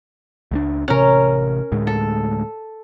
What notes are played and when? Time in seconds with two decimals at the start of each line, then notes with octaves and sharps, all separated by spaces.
0.51 C#2 G#3 D4
0.88 A1 C3 C#4 A#4
1.72 D2 A2 G#3
1.87 A4